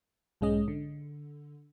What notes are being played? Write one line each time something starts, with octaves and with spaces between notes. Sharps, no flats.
B1 G#2 G#3 C#4 D#5
D3